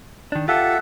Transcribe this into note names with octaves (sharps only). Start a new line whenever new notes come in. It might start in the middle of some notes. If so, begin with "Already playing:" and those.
D#3 D4
F4 G4 A4 E5 F#5